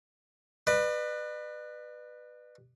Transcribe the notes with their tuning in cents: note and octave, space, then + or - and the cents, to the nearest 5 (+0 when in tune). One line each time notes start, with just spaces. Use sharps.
B4 +0 D5 +45